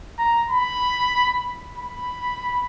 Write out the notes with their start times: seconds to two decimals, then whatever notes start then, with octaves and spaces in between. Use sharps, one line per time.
0.19 A#5
0.50 B5
1.78 B5